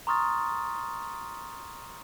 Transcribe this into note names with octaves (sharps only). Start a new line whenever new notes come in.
A#5 C6 C#6 D#6 F6 A6